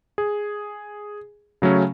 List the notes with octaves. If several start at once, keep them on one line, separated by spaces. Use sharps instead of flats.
G#4
C#3 F#3 A3 C#4